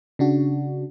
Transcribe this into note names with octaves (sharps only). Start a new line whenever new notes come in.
C#3 D4 F#4